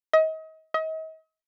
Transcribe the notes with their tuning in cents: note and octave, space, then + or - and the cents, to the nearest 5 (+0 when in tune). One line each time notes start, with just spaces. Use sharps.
D#5 +35
D#5 +40